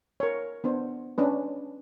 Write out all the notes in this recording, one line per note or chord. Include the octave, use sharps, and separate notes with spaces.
A#4 C#5
B3 D4 C5
C#4 D4 B4